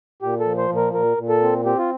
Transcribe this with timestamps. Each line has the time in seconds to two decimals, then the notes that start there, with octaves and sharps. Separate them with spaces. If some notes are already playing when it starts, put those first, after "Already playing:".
0.22 A#2 G4
0.40 A4
0.45 F3
0.58 C5
0.70 A#2
0.76 A#4
0.94 A#2 A#4
1.17 A#2
1.29 A4
1.42 C4
1.65 C4 G4
1.78 F4